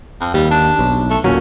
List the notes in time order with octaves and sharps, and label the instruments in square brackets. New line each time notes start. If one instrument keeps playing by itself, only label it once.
[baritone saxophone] F2
[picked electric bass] D#2 [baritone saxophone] G3
[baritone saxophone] D4
[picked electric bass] B1
[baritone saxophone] A3
[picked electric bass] D1 A#2 F#3 [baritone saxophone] C#4